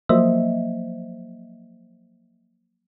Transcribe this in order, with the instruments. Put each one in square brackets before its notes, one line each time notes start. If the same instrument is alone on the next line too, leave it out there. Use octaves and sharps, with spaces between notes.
[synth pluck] F3 F#3 A#3 C5 D#5 E5